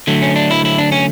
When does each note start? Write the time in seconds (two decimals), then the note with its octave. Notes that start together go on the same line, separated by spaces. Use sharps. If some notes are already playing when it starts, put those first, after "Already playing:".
0.07 D3 F#3 A3
0.22 C#4
0.36 D4
0.51 E4
0.65 E4
0.78 D4
0.92 C#4